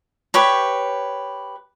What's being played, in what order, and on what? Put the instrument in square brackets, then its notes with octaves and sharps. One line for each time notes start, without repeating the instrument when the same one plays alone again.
[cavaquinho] G4 B4 C#5